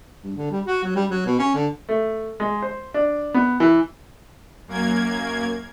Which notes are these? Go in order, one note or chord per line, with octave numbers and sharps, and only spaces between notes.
G2
D3
G3
F#4
F#3
G3
F#3
B2
C#4
D3
A3
G#3
C5
D4
B3
E3
F#2 A#3 G#6